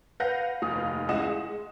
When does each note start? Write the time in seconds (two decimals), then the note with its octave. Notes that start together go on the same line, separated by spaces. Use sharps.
0.20 B4 F5 F#5 G6 A#6
0.62 F1 D#2 F5 D#6
1.09 C#2 E4 D#5 F#5 E7
1.27 G#3